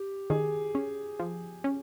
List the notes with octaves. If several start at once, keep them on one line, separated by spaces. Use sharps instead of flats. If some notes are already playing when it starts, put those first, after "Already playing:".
Already playing: G4
D#3 G#4
C#4
F3
C#4